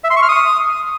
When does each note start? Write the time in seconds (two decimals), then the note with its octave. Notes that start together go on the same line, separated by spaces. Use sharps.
0.04 E5
0.10 C6
0.16 C#6
0.23 F6
0.29 D#6